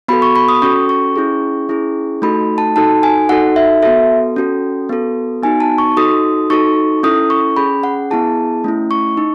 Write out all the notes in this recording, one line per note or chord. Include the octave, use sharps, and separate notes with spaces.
B3 F#4 A4 B5
C#6
B5
D#6
C#4 F#4 A4 C#6
C#6
C#4 E4 G#4
C#4 E4 G#4
A3 D#4 F#4 A4 B5
A5
D#4 F#4 A4 A5
G#5
D#4 F#4 A4 F#5
E5
B3 F#4 A4 E5
C#4 F#4 A4
B3 F#4 A4
B3 D#4 F#4 G#5
A5
C#6
D#4 F#4 A4 D#6
D#4 F#4 A4 C#6
C#4 E4 A4 D#6
C#6
C#4 G#4 B5
F#5
B3 E4 G#4 A5
A3 C#4 E4
C#6
D#4